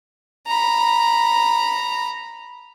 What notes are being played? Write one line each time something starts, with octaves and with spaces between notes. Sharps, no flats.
A#5 B5